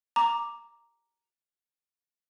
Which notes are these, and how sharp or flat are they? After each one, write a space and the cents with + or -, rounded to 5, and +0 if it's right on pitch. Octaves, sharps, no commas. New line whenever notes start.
A#5 +0 D6 +0